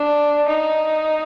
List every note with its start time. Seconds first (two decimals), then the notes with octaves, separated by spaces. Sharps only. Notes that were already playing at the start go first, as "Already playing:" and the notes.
Already playing: D4
0.48 D#4